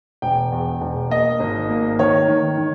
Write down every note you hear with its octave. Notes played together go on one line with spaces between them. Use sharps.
E1 G5
E2
E1
A#3 D#5
G#1
A#3
D#3 C#5
D#3
D#3